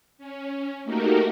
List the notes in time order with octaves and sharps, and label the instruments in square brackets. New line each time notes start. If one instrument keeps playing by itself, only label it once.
[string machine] C#4
A3 A#3 D#4 F#4 G4 A#4